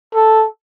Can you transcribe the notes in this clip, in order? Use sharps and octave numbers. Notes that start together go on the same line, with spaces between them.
A4